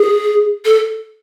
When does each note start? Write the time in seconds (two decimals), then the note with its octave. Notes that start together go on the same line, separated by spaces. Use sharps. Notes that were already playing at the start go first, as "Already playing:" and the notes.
Already playing: G#4
0.65 A4